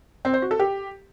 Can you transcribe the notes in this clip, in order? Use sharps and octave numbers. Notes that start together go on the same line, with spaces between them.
C4
C5
F#4
A4
G4